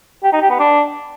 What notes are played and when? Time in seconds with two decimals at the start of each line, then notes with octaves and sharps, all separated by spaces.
0.24 G4
0.33 D#4
0.42 G4
0.51 B3
0.60 D4